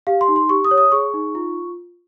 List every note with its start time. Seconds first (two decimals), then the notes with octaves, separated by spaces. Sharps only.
0.07 G4 F5
0.21 C6
0.28 D#4
0.36 C6
0.49 G4 C#6
0.65 D#6
0.71 C#5
0.78 D#6
0.92 G#4 C#6
1.14 D#4
1.35 F4